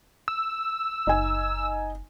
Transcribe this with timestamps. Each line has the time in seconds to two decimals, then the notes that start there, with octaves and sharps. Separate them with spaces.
0.28 E6
1.07 F#1 D#4 G#5